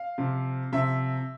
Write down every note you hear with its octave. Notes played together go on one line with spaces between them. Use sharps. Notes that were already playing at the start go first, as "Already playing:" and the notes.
Already playing: F5
C3 F3
C3 F3 E5